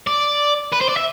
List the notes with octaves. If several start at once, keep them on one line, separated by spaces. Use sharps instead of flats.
D5
B4
C5
D5
E5